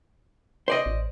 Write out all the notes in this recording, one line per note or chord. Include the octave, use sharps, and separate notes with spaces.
C5 D5 D#5
A1